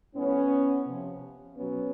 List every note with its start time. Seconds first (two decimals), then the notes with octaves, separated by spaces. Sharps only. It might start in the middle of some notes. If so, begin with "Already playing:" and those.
0.15 A2 F3 B3 C#4
0.86 C3 F3
1.57 B2 F#3 B3 C#4